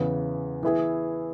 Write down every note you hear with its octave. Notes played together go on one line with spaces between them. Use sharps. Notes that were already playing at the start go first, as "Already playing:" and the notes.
Already playing: E2 C#3 E3 B3
E3 B3 E4 G#4